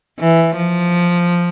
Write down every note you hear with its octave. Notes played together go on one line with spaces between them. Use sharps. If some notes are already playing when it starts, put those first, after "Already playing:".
E3
F3